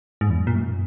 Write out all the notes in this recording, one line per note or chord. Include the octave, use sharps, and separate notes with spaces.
G#2
E2
F#2
A#2
F#2